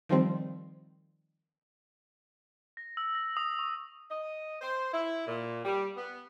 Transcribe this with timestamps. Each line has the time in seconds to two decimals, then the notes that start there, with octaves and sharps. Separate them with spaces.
0.09 D#3 F3 G3 C4
2.77 A#6
2.97 E6
3.15 A#6
3.37 D#6
3.59 C#6
4.10 D#5
4.61 C5
4.92 E4
5.27 A#2
5.65 G3
5.97 B3